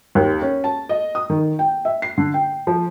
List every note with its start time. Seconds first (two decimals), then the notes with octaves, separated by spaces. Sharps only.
0.15 D#2
0.42 C#4
0.64 A5
0.89 D#5
1.15 D#6
1.30 D#3
1.59 G5
1.85 E5
2.02 C7
2.18 D3
2.34 G5
2.67 F3